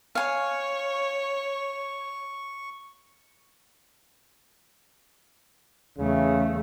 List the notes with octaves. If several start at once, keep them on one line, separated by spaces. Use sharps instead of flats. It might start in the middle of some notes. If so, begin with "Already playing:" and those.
C#5 F5 G#5 C#6
E2 C#3 A3